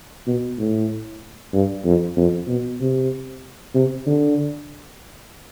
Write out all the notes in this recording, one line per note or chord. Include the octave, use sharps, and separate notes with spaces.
B2
A2
G2
F2
F2
B2
C3
C3
D3